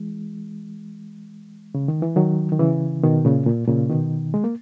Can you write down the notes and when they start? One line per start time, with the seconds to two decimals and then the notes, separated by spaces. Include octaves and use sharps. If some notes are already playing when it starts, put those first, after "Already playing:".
Already playing: E3 G#3
1.75 C#3
1.88 D#3
2.02 E3
2.16 D#3 F#3
2.52 D#3
2.59 C#3 E3
3.03 B2 D#3
3.25 A#2 C#3
3.47 A#2
3.68 A#2 C#3
3.90 B2 D#3
4.34 G#3
4.44 A#3